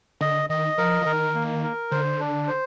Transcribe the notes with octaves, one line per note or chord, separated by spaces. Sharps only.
D3 D#5
D#3 D#5
F3 A#4
F3
D#3 A#4
A#3
A#4
D3 C5
D4
C5